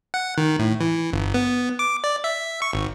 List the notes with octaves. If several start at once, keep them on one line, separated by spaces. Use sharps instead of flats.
F#5
D#3
A2
E3
G1
B3
D6
D5
E5
C#6
G#1